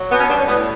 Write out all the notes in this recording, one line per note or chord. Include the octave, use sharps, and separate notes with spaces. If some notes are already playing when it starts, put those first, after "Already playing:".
Already playing: F#3
B2 B3
C#4
G3 B3 D4
C#4
A2 B3